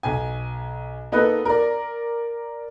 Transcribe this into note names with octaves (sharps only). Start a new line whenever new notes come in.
B1 G#5
A#3 B3 D#4 A4 B4
A#4 D5